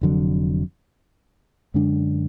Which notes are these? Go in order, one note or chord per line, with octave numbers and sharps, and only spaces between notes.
F1 F2 D3 F#3
F#2 D3 G#3 D4